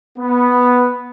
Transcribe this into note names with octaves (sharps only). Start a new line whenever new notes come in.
B3